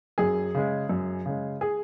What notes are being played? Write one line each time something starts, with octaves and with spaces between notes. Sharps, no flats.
F#2 G#4
C#3 G#3
F#2
C#3 G#3
G#4